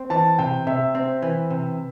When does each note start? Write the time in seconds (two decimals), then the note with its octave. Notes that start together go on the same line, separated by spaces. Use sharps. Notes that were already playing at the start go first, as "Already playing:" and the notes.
Already playing: C4
0.10 E3 A5
0.38 C3 G5
0.67 C3 E5
0.95 C4
1.22 E3
1.50 C3